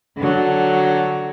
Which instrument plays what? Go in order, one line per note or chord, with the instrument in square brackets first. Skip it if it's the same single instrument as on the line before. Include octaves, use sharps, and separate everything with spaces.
[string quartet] D3 F#3